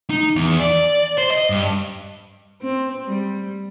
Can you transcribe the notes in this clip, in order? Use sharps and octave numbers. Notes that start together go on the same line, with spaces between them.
D#4
E2
D5
C5
D#5
G2
C4
G3